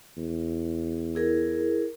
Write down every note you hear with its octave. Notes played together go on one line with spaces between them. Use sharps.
E2
E4 G#4 A#4